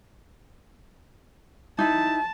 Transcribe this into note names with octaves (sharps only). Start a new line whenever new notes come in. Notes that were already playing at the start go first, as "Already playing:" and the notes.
D#4 E4 A5